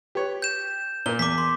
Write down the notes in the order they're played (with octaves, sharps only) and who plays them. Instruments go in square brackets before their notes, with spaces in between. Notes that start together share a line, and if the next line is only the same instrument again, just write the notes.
[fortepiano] G4 B4 C#5
[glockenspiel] G6 E7
[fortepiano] A#2 A#4 [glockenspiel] G7
[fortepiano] E2 [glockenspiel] D6 B6
[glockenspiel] C6